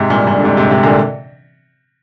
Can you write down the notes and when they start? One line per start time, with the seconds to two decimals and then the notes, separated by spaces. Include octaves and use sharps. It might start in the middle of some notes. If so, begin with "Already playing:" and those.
Already playing: G#2 C3
0.10 G2 A#2
0.27 G2 A#2
0.37 D3
0.44 G#2 C3
0.57 G#2 C3
0.70 G#2 C3
0.83 A#2 D3